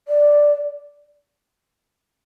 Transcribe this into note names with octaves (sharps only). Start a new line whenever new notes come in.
D5